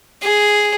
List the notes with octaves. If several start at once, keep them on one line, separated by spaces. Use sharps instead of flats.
G#4